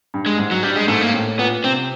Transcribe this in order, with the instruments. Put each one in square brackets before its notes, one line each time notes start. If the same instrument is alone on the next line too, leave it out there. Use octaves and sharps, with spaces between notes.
[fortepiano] G2
[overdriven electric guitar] G#3
[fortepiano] G#2
[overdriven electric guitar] F#3
[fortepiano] G2 [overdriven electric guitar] G3
[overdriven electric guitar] G#3
[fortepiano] G#2 [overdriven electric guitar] A3
[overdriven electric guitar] A#3
[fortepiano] A2
[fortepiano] A#2 [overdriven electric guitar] B3
[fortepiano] C3 [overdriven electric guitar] C4